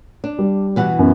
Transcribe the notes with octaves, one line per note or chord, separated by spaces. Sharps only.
D4
G3
B2 E3 F#5
F#2 B3